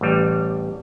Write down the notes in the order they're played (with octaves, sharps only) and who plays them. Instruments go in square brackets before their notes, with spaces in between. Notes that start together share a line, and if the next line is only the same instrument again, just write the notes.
[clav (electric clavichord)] A1 G3